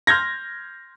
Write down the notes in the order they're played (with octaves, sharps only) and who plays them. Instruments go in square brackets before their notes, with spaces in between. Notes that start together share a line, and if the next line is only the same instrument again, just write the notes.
[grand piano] C6 F6 G6 G#6 A#6